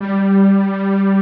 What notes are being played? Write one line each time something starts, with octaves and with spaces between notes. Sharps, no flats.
G3